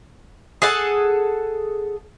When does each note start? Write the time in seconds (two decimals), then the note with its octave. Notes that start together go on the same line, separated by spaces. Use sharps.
0.62 G#4 A4 F#5 A5